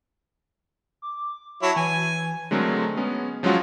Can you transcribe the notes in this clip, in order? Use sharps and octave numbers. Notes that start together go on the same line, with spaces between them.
D6
F#3 E4 C#5 A5
E3 G#5
D3 F#3 G#3 A3 C4 A#4
G#3 B3 C#4
F3 F#3 G#3 C#4 F4 F#4